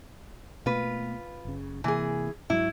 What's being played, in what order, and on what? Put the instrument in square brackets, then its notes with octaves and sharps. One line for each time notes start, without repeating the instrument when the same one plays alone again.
[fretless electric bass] B2 A3 A#3 [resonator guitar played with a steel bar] F4 B4
[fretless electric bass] F#1 C#3
[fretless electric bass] C3 A#3 [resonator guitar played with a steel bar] E3 G#4
[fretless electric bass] G#2 F#3 [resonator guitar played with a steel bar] E4